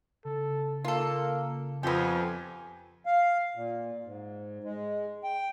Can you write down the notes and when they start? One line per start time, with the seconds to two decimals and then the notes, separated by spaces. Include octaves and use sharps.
0.25 C#3 A4
0.85 A#3 F4 A4
1.83 F2 B3 G4 G#5
3.06 F5
3.55 A#2
4.04 G#2
4.64 G#3
5.24 G5